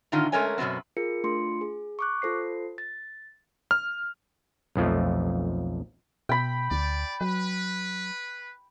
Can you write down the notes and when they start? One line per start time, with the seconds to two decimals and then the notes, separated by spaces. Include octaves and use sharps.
0.12 A2 D3 D#3 D#4 F4
0.32 G#3 A3 C#4 A#4 C#5 G#5
0.58 F#2 B2 F#3 B3 C4
0.97 F4 G#4 A#4 C#7
1.24 A3 D4 F4 C6 C#7
1.61 G#4
1.99 C#6 D6 F#6
2.22 F4 A4 C5 C7
2.78 A6
3.71 F6
4.76 B1 F2 F3 A3
6.29 B2 G5 B5
6.71 D2 D5
7.21 F#3 B4